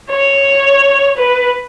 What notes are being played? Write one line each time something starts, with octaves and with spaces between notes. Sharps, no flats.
C#5
B4